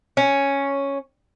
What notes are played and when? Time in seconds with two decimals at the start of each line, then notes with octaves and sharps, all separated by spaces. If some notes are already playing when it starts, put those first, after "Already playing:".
0.17 C#4